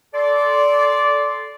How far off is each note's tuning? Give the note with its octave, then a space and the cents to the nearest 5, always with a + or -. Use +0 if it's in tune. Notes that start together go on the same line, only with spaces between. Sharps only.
A4 -15 D5 -15 C6 +0